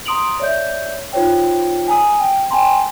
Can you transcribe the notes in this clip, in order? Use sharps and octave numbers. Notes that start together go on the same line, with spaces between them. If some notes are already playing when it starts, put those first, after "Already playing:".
A#5 C6 D#6 D7 F7 F#7
C#5 D5 E5 G6
D#4 F4 C5 C#5 G5
G#5 A#5 D#6
G5
G5 G#5 A#5 C6